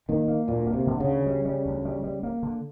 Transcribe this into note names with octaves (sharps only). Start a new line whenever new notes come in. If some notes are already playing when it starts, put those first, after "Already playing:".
D#3 A#3
A#3
D2 A#2
A#3
C3
D3
C#3
D2
G3
G3
D2
G3
G3
A#3
D3